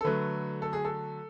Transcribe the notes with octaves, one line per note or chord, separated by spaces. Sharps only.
A4
D3 F#3 A3 B4
A4
G#4
A4